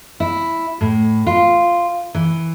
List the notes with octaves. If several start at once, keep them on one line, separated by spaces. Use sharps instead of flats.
E4
A2
F4
E3